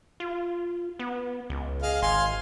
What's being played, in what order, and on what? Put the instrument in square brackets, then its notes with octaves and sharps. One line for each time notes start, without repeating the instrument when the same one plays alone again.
[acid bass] F4
B3
C#2
[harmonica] G#4 D#5 F5
[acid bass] G#1 [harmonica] F5 G#5 C6